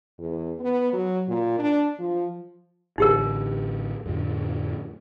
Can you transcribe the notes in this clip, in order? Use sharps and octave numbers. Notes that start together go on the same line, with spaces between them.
E2
B3
F#3
A#2
D4
F3
A1 D3 D#4 G4 A#4
F2 A2 D3